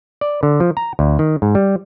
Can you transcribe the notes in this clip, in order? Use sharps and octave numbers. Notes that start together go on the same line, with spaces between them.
D5
D3
F3
A#5
D2
D#3
G#2
G3